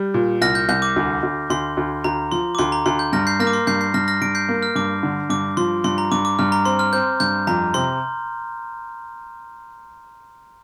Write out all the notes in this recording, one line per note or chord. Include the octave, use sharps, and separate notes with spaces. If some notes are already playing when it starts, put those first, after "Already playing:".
Already playing: G3 G6
A#2
C2 F6 A#6
G6
C2 G6
D6
D2
D2
D2 C6
D2
D2 A#5
F3 C6
D6
D2 C6
A#5
D2 C6
G6
G2 F6 A#6
G6 C7
A#3 F6 A#6
D6
C6
G2 G6 C7
G6 C7
G2 F6 A#6
F6 A#6
G2 A#6 D7
G6 C7
A#3
F6
G2 D6
D3
G2 D6
F3 C6
G2 C6
A#5
G2 D6
D6
G2 F6
A#5
C4 C6
F6
C4 G6
G2 G6
F2 A#5
C3 C6